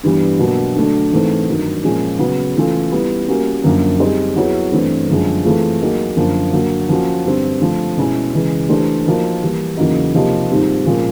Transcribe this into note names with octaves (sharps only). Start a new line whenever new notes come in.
G2 E3 G3 B3
B2 F#3 A#3 D4
D3 F#3 A3 D4
G#2 E3 A3 C4
G2 D#3 F#3
A#2 F3 G#3 C#4
C#3 F#3 B3
E3 A3 C#4 F4 A4
G3 B3 E4
G3 A#3 C#4 F#4 A#4
F#2 D3 F3 A#3
G3 C4 D#4 G#4 C5
F#3 B3 E4 G#4 C#5
G2 E3 A3 C4
F#2 D3 F3 G#3
E3 A3 C4 F4 G#4
F#3 A#3 D#4 G#4
F#2 D3 F3 A#3
D3 F#3 A#3
F3 A#3 C#4 F#4
G2 D3 G3 C4
D3 F3 A3
B2 G#3 C#4 E4
C#3 E3 G#3
E3 A3 D4 G4 C5
F3 A#3 D#4 F#4 A#4
E3 G3 A#3
E2 C#3 F#3 A#3 D#4
C3 F3 A#3 D#4 G4
G#2 D#3 G3 C4 F4
A#2 F3 G#3 C#4